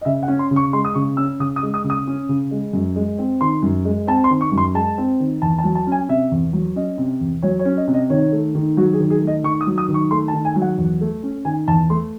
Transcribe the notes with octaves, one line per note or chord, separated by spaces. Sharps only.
D#5
C#3 E5
F#5
C#4
C6
C#3
C#6
G#3 C6
D#6
C#3 C#6
C#4 E6
C#3 D#6
D#6
G#3
D#6
C#3
D#6
C#4
C#3
G#3
F#2
G#3
C4
D#3 C6
F#2
G#3
C4 A5
C6
D#3
C#6
F#2
C6
G#3 A5
C4
D#3
E2 A5
A5
F#3
A5
C#4
G#5
C3 E5
E2
F#3
C#4 D#5
C3
E2
F#3 C#5
C#5
C#4
D#5
C3
D#5
D#3 C#5
A3
D#3
F#3 F#4
G#4
D#3
G#4
A3
D#5
D#3 C#6
D#6
F#3
D#6
D#3
C#6
A3 C6
A5
D#3
G#5
F#3
F#5
E2
A3
C#4
D#3 G#5
E2 A5
A3 C6